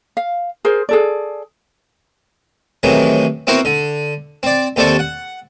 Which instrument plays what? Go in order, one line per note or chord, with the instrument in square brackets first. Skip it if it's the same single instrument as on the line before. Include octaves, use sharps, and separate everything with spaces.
[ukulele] F5
G#4 A#4 C5
G#4 A4 D5
[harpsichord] A2 C3 D#3 E3 F#3
B3 C4 E4 F#4 A#4 C5
D3
C4 D5
D#2 C3 A4 C5 D5 C#6
F#5